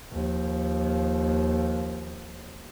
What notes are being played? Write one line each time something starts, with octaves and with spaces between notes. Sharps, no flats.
D#2 F3